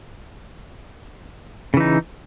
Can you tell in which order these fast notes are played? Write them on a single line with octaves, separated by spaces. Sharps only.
C#3 E3 D#4